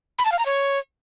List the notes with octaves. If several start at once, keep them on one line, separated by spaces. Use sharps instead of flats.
B5
A5
F5
A#5
C#5